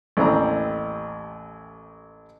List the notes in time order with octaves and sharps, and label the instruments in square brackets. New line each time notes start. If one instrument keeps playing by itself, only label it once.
[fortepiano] A1 D#2 C4 E4 D5 A#5